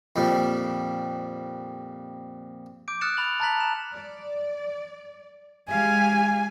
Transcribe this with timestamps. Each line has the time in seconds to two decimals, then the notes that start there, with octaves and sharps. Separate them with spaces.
0.16 F2 A#2 G3
2.88 D6 G6 D7
3.01 D#6 F6 F#6 A6 C#7 E7
3.17 B5 A6 F7 F#7
3.40 A5 A#5 F#6 A6 B6 F#7
3.60 E7
3.93 D5
5.70 G#3 G4 F5 G#5